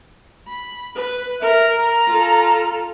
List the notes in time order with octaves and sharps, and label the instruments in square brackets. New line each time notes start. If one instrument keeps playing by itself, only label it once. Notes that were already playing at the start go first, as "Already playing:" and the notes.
[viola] B5
B4
[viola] A#4 [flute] E5
[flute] A#5
[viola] F4 A4